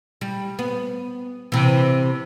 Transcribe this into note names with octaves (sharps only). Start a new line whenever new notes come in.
G3
B3
C3 E3